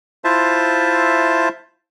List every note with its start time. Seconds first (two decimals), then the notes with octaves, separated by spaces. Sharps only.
0.24 E4 F4 C5 E5 A5